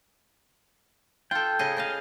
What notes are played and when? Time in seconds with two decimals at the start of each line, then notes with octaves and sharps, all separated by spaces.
1.31 F4 A4 G5
1.59 C#3 G#4 D#5
1.77 C#3 D#5 F5